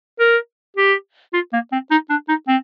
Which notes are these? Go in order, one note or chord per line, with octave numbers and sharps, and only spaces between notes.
A#4
G4
F4
A#3
C4
D#4
D4
D#4
C4